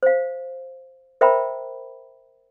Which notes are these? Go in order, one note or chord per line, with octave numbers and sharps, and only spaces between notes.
C5 F5
A#4 C5 E5 G5 A#5 B5